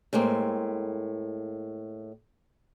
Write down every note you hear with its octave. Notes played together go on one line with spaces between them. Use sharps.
A2 G#3 A#3 C4